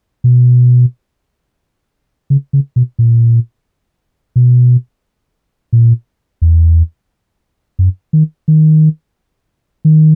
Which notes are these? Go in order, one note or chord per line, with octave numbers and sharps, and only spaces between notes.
B2
C#3
C#3
B2
A#2
B2
A#2
E2
F#2
D#3
D#3
D#3